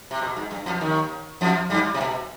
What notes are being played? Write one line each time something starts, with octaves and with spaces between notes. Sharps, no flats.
C3
B2
G#2
G2
F2 F3
D#2 D#3
F2 F3
G2 G3
C3
B2